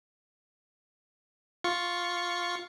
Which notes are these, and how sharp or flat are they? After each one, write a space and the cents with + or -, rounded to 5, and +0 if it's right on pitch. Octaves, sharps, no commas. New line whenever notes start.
F4 +5 C#6 +0